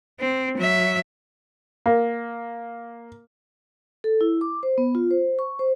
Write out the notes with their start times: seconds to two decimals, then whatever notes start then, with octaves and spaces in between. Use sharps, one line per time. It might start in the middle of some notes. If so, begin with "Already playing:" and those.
0.20 C4
0.57 F#3 E5
1.86 A#3
4.04 A4
4.21 E4
4.41 D6
4.63 C5
4.78 B3
4.95 F4
5.11 C5
5.39 C#6
5.59 C5